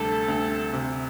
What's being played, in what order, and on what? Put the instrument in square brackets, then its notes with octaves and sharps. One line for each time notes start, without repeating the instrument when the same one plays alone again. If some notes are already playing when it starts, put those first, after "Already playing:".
Already playing: [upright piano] D2 C3 G3 [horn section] A4
[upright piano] D2
C3